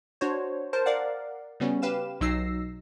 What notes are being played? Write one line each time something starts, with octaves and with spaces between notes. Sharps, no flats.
D4 F#4 C5 C#5
A#4 C5 A5
A#4 D5 F5 F#5
C#3 G3 B3 C#4 F#4
G4 B4 F5 E7
B1 F#3 D#4 E6 A#6 C7